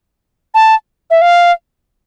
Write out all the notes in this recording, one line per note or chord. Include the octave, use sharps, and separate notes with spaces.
A5
E5
F5